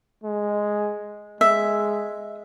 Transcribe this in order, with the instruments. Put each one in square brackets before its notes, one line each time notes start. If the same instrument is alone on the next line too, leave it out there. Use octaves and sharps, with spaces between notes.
[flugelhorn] G#3
[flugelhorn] G#3 [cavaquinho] E5